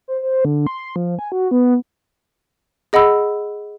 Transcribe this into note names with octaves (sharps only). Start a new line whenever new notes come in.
C5
C5
D3
C6
F3
G#5
F#4
B3
G#4 D#5 F#5 B5 E6